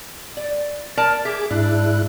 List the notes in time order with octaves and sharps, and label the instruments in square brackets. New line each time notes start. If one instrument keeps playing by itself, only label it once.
[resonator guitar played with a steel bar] D5
A#4 D5 A5
[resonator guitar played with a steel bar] G4 E5 [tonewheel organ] G#4 D6
[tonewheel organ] G#2 E4 F#6 [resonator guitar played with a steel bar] D4